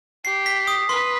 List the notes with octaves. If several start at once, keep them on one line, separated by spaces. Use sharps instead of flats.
G4 C7
B6
D#6
B4 C6